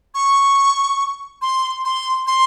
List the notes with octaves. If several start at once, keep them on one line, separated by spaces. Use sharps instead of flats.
C#6
C6
C6
C6